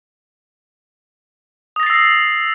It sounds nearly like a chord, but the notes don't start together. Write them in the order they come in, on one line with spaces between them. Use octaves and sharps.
D#6 A#6 A6 C7 E6